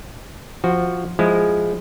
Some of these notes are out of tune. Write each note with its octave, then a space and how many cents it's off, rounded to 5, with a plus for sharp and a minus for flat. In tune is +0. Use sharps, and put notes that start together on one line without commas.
F3 +0 F#4 +0
F3 +0 G#3 +0 E4 +0